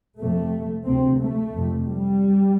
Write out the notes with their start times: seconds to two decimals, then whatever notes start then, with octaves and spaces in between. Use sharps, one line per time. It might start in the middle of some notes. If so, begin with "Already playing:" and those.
0.18 F2 C3 A3
0.85 D2 C3 C4
1.19 A3
1.53 F2 C3
1.87 G3